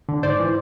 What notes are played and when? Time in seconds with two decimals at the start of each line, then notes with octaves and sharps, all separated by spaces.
0.09 D3
0.23 G#2 C5 D5
0.40 E3